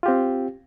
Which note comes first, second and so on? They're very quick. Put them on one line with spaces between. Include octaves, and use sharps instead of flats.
F4 G4 C4